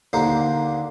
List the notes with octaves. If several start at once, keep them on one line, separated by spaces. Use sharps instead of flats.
D#2 D3 A#3 C5